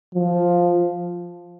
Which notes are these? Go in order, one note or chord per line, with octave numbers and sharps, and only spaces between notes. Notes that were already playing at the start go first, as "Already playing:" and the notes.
F3